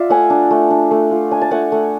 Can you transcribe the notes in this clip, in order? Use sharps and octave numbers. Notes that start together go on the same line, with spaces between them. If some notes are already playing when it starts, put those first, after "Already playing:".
Already playing: F4 D5 E5
A3 F#5 G#5
D4
A3
D4
A3
F4
D4 G#5
A5
A3 F#5 G#5
A3